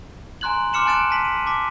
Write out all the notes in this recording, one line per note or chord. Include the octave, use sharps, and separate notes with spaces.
G#5 A#5 C6 F#6 G#6 F#7
C6 D6 F6 C#7 E7 F#7
G#5 A5 F#6 A6 D7 E7
A5 B6 F#7
D#7
A5 D6 B6